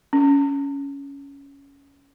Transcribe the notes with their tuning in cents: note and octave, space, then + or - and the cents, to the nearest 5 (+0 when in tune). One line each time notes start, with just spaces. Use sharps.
C#4 +10